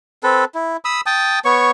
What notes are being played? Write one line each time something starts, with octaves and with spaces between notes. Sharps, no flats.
C4 A4 B4
E4
B5 D#6 E6
G5 A5 D#6
B3 C#5 C#6